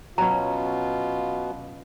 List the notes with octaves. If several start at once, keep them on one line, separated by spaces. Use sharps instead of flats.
B2 F#3 C#4 F4 A#5